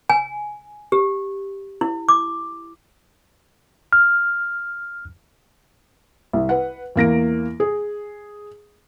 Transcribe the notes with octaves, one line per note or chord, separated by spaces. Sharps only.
G#5
G4
E4
D6
F6
C2
B4 F#5
E2 A#3 A#6 D7
G#4